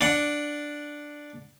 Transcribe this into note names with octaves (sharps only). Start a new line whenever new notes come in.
D4 F#5